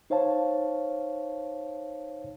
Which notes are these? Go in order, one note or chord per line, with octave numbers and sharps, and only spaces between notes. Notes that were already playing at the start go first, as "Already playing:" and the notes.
D#4 C5 C#5 F5 A5